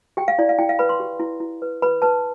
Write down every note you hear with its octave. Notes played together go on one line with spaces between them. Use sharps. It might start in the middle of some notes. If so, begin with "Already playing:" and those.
G4 G5
F5
E4 D5
F5
E4 G5
F5
B4 B5
C6
G4
E4
E4
B4
B4 B5
B4 A5